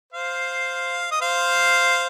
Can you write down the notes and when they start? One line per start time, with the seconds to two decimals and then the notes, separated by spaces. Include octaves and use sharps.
0.13 C5 F5
1.11 D#5
1.21 C5 F5